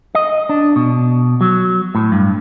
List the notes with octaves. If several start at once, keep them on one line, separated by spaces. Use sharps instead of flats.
D#5
D4
B2
F#3
A2
G2